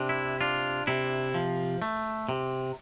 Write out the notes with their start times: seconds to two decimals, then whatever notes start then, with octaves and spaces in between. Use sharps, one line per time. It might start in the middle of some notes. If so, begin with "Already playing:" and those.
Already playing: C3 D4
0.09 E4
0.41 D4 F4
0.87 C3 E4
1.34 F3
1.82 A3
2.29 C3